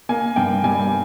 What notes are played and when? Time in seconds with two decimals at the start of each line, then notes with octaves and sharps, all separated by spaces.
0.09 A#3 G#5
0.36 G2 G5
0.64 G3 G#5